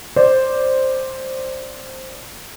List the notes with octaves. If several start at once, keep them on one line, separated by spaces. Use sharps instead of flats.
C5 D5